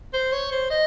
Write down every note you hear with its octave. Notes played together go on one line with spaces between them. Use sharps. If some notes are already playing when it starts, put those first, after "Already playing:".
C5
C#5
C5
D#5